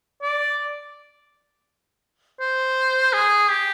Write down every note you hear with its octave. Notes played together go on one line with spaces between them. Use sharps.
D5
C5
G#4
G4